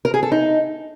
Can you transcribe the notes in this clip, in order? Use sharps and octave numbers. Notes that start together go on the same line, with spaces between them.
A#4
G#4
A4
D#4